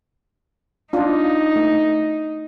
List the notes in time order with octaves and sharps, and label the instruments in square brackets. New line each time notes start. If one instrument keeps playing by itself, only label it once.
[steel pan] D4 F4 [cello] D#4
[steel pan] A3